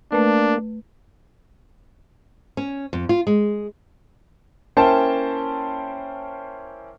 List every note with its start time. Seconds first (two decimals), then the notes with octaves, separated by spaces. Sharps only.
0.12 A3 A#3 D4 B4
2.57 C#4
2.93 F2
3.09 F4
3.27 G#3
4.77 A#3 C#4 E4 C5 G5 A5